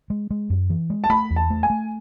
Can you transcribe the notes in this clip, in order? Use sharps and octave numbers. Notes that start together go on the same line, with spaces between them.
G#3
G#3
F#2
E3
G#3
A5
A3 B5
E2
A5
A3
G#5
A3